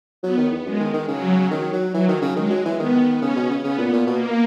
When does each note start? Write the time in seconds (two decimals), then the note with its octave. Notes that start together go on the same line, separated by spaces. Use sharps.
0.23 F#3 B3
0.37 D#3
0.51 E2
0.65 F#2 G#3
0.80 D#3
0.94 D#3
1.08 C#3 F#3
1.51 D#3
1.73 F#3
1.94 E3 F#3
2.08 D#3
2.22 C#3
2.36 D#3 G#3
2.50 F#3
2.65 E3
2.79 D#3 B3
3.22 C#3 C#4
3.36 B2
3.51 C#3
3.65 C#3 B3
3.79 A#2
3.93 A#2
4.07 B2 A#3